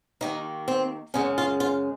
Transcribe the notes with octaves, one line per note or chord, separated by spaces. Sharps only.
D#2 D#3 A#3 D#4
C4
F#2 C#3 G#3 C#4
F4
F4